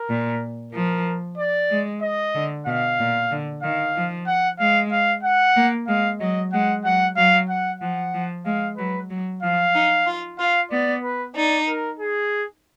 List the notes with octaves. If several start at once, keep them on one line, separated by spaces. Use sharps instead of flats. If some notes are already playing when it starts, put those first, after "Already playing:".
Already playing: A#4
A#2
F3 A#4
D5
G#3
D#5
D3
B2 F5
A#2
D3
D#3 F5
F3
F#5
G#3 F5
F5
F#5
A#3
G#3 F5
F#3 D#5
G#3 F#5
F#3 F#5
F#3 F5
F#5
F3 F#5
F3
G#3 F5
F#3 B4
F#3
F3 F5
D#4
F4
F4 F5
B3 D5
B4
D#4 D5
A#4
G#4